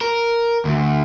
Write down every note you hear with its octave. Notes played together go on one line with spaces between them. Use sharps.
A#4
D2